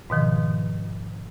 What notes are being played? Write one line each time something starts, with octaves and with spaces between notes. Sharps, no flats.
G#2 B2 D#3 F3